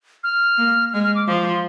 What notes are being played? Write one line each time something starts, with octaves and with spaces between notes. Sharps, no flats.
F6
A#3
G#3 F6
F6
D6
F3 D6
C6